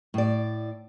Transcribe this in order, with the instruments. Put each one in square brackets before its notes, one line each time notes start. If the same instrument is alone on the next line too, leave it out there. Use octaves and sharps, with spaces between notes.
[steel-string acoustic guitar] A2 D5